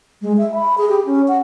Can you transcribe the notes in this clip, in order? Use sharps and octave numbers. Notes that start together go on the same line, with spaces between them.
G#3
E5
B5
G#4
G4
C#4
F#5